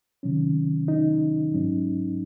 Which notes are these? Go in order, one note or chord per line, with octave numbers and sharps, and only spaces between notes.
C3 D#3 F#3 C#4
D#4
G#2 F#3 C#4